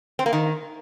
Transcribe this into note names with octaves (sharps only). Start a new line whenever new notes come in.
C4
A#3
D#3